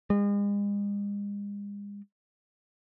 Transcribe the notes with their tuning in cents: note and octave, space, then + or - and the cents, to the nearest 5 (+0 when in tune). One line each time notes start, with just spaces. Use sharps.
G#3 -40